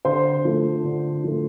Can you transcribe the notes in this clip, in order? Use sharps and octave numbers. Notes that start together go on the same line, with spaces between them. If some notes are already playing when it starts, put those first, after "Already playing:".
D3 C5 C6
F3 A3
D3
F3 A3